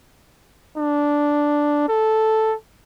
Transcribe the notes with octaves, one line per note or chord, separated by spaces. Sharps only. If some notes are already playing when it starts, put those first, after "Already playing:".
D4
A4